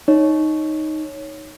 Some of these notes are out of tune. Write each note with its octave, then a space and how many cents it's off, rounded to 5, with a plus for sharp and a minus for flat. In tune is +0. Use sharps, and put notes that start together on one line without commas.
D#4 +0 C#5 +0